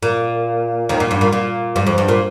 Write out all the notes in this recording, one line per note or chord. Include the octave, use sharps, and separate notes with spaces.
A#2
D#2 D#3
A#2
G2
A#2
A#2
G2
F2
G2
A#2